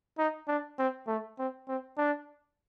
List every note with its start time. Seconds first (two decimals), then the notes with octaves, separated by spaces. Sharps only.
0.18 D#4
0.48 D4
0.78 C4
1.07 A3
1.39 C4
1.68 C4
1.98 D4